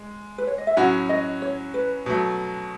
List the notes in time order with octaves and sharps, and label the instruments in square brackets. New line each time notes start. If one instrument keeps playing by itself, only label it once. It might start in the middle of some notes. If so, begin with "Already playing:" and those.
Already playing: [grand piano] G#3
[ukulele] B4
C#5
D#5
E5
[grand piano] A2 F#3 C#4 F#4 [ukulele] F#5
[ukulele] D#5
C#5
B4
[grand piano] B2 F#3 A3